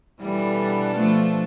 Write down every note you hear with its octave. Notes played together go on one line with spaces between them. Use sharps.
B2 E3 G3 B3 D4 A4
F3 A3